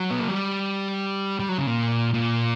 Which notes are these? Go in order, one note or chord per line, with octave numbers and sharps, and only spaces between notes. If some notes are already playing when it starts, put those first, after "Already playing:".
Already playing: F#3
B3
A#3
G3
G3
F#3
C#3
A#2
A#2